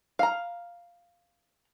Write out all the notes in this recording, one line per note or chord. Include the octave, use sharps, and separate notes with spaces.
F5 A#5